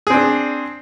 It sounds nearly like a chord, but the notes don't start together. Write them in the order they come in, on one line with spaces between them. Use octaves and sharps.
G#4 C4 D4